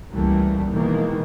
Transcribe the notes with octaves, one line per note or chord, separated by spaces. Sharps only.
C#2 E3 G3 A3 A#3
B2 D#3 E3 G#3 A#3 B3